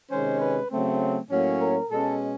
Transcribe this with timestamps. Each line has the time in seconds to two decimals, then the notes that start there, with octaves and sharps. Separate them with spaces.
0.11 C3 D#3 G#3 C#4 C5
0.40 B4
0.71 C#3 F#3 A3 C4
1.30 A2 F#3 A#3 C#4
1.60 A#4
1.89 B2 G#3 C#4 A4